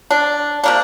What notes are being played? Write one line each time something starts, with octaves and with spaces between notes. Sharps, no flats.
D4
C3 A#3 D4